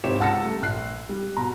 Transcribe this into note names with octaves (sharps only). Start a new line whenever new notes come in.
G#1 C4 G4 C#5 D6 E7
C#2 F#5 A5 E6 A#6 C#7
G3 A3
A#1 F#6 C7
G3
B2 A#5